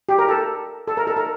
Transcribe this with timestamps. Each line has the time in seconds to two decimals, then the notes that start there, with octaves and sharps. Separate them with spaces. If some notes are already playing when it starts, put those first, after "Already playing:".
0.09 G4
0.19 A#4
0.29 A4
0.88 A4
0.97 A#4
1.07 A4
1.17 A#4